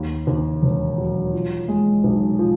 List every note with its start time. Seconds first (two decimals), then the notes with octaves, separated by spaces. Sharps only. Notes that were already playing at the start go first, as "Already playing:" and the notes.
Already playing: D#2
0.27 D#2
0.62 E1
0.98 F#3
1.33 F3
1.68 G#3
2.04 B1
2.39 F3